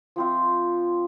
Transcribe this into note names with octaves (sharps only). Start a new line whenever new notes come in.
F3 C4 F4